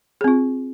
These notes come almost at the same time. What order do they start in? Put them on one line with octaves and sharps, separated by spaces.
G#4 C4 F4